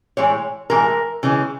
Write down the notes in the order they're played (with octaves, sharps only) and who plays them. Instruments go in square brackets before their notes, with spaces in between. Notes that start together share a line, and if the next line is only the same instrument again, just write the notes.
[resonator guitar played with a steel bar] A2 E3 G#3 C#5
A2 E3 G#3 A#4
C#3 E3 G#3